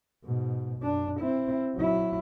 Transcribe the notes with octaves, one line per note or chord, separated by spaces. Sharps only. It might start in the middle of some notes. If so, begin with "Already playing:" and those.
G#2 B2
F#2 D4
C4 E4
F#3 E4